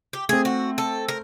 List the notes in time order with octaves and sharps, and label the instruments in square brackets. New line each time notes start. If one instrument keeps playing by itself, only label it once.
[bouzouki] G4
[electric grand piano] A3 C4 [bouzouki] G#4
[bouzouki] F#4
A4
A#4